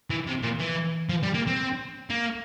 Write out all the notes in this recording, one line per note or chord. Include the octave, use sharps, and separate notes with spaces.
E3
C3
A#2
E3
F3
G3
A#3
C4
A#3